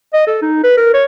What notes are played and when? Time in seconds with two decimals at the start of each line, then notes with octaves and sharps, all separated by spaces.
0.13 D#5
0.27 A4
0.42 D#4
0.64 B4
0.77 A#4
0.94 C#5